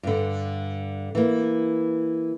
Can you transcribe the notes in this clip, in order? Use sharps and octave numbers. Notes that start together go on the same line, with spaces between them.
G2 D3
E3 A#3